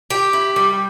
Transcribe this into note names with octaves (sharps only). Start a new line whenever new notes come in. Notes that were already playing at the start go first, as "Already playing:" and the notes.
G4
E4
G3